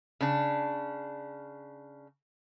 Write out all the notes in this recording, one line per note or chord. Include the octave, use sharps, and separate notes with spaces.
C#3 D4